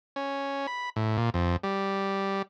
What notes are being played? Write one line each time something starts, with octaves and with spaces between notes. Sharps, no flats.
C#4
B5
A2
A#2
F2
G3